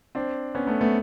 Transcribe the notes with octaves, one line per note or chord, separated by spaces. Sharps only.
C4 D4
B3 C#4
A3 B3
A3 B3